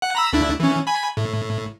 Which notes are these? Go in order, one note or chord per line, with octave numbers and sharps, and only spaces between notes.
F#5
A#5 B5 E6
D2 D4 E4
E3 C#4
G#5 B5
A2